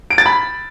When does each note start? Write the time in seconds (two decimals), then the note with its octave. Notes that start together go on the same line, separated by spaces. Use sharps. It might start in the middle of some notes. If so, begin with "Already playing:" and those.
0.11 D7
0.18 A6
0.26 B5